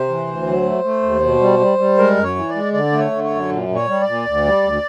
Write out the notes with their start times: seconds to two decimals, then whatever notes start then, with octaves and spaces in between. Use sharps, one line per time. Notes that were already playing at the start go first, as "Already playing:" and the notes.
Already playing: C3 C5
0.08 E3
0.27 D2
0.46 F#3
0.65 A3
0.84 A3
1.02 D#2
1.22 B2
1.40 G3
1.59 G3
1.78 G3
1.98 G#3 A#4
2.17 F#2
2.24 C#5
2.36 E3
2.49 D5
2.55 G#3
2.73 D3 D5
2.92 A3
2.99 C#5
3.11 D3
3.24 C#5
3.30 F#2
3.49 A#2
3.68 A#2
3.75 C#5
3.87 G3
4.01 D5
4.07 A#2
4.26 D2
4.45 G3
4.63 D2